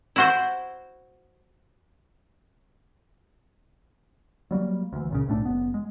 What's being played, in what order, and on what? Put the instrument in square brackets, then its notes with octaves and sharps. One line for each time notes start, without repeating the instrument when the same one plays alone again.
[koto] E4 F#4 C5
[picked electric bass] F#3 G3 A#3
D2 E3
C#2 A#2 C#3
B1 A2 A3 D4
F#1 B3
G#3